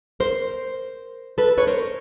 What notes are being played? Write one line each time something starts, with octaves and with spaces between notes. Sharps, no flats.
A#4 C5
A4 B4
B4 C#5
A#4 C5